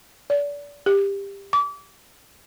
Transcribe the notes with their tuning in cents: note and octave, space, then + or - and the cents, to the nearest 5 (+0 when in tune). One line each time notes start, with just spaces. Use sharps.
D5 -30
G4 +20
D6 -30